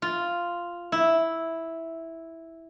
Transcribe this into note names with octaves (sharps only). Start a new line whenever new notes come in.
F4
E4